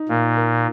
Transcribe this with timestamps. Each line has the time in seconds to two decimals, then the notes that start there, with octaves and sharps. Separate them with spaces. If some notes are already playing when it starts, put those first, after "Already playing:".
Already playing: D#4
0.09 A#2 A#3
0.37 A#4